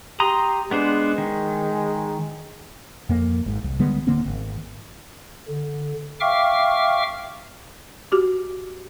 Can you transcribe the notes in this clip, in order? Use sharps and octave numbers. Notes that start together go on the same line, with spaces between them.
G4 A#5 C6 D#6
G#3 B3 D4 C5
D#3
F2 A#3
G#1 G#2
C2
D3 G3 G#3 B3
D1 D3 A#3 C4
G#1
D3
E5 F5 G5 C#6 D6 F6
F#4 G4 D6